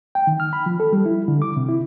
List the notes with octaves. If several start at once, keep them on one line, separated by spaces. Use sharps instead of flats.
G5
D#3
F6
B5
F3
A4
G3
E4
D3
D6
C3
E4